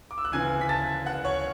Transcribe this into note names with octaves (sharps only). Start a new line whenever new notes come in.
D6
E6
F#6
D2 C#3 E3 G#5 G#6
B6
A5 A6
F#5 F#6
C#5 C#6